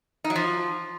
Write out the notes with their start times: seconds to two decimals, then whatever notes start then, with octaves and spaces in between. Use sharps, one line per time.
0.24 D#4
0.30 F#3
0.36 F3